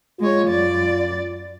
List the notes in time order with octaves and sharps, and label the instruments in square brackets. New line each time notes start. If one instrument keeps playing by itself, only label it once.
[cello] G#3 C#5 [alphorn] F4
[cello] F#2 D5